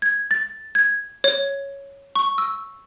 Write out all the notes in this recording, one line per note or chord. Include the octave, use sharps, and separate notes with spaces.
G#6
A6
G#6
C#5
C#6
E6